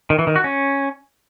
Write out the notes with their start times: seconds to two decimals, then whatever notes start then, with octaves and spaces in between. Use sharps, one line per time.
0.10 D#3
0.19 E3
0.27 D#3
0.36 F#4
0.44 C#4